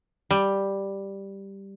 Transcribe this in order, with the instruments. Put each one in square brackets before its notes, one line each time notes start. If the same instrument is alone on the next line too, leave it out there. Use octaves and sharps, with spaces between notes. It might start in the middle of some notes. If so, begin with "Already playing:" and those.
[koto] G3